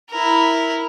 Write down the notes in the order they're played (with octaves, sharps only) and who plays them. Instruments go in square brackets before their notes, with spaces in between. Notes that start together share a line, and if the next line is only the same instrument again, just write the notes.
[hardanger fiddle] E4 A#4